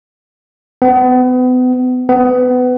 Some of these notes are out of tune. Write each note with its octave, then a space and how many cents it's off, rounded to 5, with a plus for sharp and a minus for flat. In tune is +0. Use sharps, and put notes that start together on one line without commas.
B3 +35
B3 +25